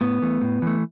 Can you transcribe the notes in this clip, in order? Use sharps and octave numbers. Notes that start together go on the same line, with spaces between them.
A2 B3
E3 A3
A2
E3 A3